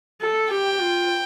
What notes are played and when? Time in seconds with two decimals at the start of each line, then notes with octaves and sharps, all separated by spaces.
0.21 A4
0.51 G4 G5
0.81 F4